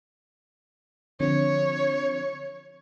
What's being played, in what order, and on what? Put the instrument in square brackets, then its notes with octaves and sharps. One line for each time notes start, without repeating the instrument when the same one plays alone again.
[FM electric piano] D3 F3 C4 [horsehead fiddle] C#5